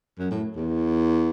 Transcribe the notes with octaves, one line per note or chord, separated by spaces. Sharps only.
F#2
A2
E2